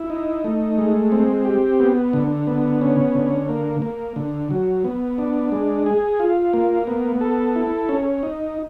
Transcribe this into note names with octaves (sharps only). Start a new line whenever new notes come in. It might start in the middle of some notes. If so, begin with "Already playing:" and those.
Already playing: E4
D#4
A3
G#3
C4
G4
B3
D3
B3
C#4
D3
A#3
A#3
D3
F#3
B3
D4
G#3
G#4
F4
A#3
B3
A4
E4
C#4
D#4